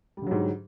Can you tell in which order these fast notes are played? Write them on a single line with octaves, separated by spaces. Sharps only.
G3 D3 F#3 G#2